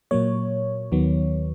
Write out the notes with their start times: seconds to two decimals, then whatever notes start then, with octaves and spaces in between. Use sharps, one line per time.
0.11 A#2 F#3 A#3 C#5
0.92 D#2 D#3 F#3 B3